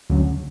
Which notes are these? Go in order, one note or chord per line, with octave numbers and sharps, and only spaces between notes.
D2 C#3 F#3